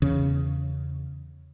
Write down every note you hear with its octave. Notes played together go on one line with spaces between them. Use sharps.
E2 C#3